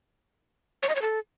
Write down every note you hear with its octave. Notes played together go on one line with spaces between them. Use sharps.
C#5
D#5
C#5
A4